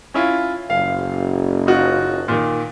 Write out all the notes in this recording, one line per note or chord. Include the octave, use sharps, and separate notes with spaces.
C#4 E4 F4
F#1 F5
D#4 F4 F#4
A#2 D#3